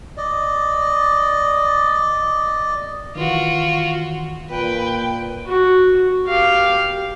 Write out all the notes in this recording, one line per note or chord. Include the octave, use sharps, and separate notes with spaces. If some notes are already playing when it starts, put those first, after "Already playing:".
D5 D#5
D#3 E3 F4 F#4
A#2 B4 G5
F#4
G4 F5